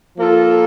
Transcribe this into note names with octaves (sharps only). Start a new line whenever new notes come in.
F3 A#3 F4 A4